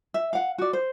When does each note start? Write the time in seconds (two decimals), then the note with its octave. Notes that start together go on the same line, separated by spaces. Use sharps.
0.14 E5
0.33 F5 F#5
0.58 F#4 D5
0.73 C5